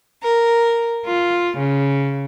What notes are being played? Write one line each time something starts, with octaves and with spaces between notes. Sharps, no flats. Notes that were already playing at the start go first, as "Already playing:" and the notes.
A#4
F4
C#3